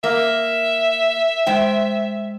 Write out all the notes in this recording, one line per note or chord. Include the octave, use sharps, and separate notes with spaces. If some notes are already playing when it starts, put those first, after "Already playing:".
A#3 E5
G#3 C5 G5